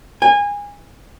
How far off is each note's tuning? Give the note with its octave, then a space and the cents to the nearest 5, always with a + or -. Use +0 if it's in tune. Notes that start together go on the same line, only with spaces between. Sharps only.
G#5 -25